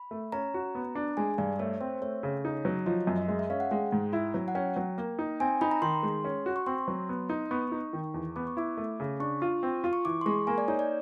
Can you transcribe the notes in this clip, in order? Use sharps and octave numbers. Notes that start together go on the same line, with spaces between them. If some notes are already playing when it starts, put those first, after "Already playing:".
Already playing: B5
A3
C#4 A#5
F#4
B3
D4
G#3 G#5
G2 D5
A3 C#5
C4 C5
A3 C#5
C#3
D#4
F#3
F3 D#5
F#2
D#5
G#3 E5
E5
C#4 F5
F#5
G#3 G5
G#2
E4
F#3
F#5
C#4 G5
F#3
A#3
D#4
C4 G#5
D#4 B5
A#5
D#3 C6
G#3
C#4
F#4
C#6
C4 C6
F#3
B3
D#4
B3 C#6
D#4
D#3
E2
B3 D6
C#6
E4 D6
A3
C#3
D4 C#6
F4
C4
F4
C#6
E3 D6
C6
G#3 C#6
A#3 G#5
D5
D#4 C#5
D5